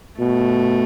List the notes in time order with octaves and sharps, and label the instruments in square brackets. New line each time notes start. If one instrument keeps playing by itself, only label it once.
[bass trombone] B2 [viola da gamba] A3